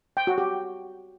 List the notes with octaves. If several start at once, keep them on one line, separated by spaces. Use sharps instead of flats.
G5
F#4
G4